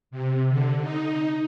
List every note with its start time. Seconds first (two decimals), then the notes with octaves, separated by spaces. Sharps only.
0.11 C3
0.49 D3
0.81 D#4